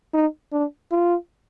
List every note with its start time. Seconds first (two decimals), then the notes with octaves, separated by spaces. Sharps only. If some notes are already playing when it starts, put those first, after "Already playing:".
0.14 D#4
0.52 D4
0.91 F4